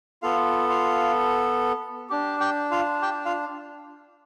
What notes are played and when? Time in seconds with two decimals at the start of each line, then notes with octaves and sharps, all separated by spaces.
0.23 B3 F4 A4 F5
0.69 F4 F5
2.10 D4 G4
2.40 G4 G5
2.71 F4 F5
3.02 G4 G5
3.26 F4 F5